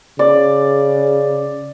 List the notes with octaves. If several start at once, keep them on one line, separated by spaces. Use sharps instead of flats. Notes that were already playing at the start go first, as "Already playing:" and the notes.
C#3 D5